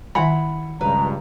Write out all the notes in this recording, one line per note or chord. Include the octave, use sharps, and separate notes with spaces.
D#3 E4 F#5 G#5 B5
C#2 G2 B4 A#5